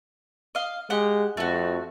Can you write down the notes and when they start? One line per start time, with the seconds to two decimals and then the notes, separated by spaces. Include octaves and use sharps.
0.55 D#5 F5
0.90 G#3 G4 F#5
1.37 F2 A3 F#4